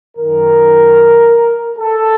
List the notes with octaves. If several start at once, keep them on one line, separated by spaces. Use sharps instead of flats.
F#2 D#3 A#4
A4